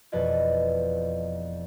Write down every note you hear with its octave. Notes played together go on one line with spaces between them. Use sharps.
E1 F2 B4 D5 D#5 G#6